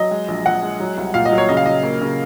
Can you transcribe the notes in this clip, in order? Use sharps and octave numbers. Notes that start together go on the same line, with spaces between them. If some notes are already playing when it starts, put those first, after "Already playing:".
Already playing: F#3 D#5
G#3
A#1
A#1 F#5
G#3
F#3
C2
A#2 F5
D#5
F#3
C#5
C#3 D#5
F5
F#3 D#5
A#3
C#3